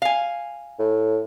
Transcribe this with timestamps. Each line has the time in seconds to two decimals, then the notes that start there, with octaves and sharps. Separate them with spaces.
0.02 F5 G#5
0.79 A2